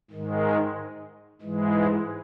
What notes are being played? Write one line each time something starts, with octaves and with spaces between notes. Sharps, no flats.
G#2 D#3 G#3
G#2 E3 G#3